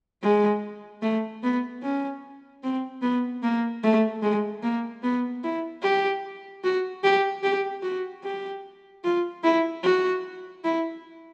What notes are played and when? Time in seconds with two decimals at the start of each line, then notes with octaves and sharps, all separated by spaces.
0.22 G#3
1.02 A3
1.43 B3
1.82 C#4
2.63 C4
3.02 B3
3.43 A#3
3.83 A3
4.22 G#3
4.63 A#3
5.03 B3
5.44 E4
5.83 G4
6.64 F#4
7.04 G4
7.43 G4
7.83 F#4
8.24 G4
9.04 F4
9.44 E4
9.83 F#4
10.64 E4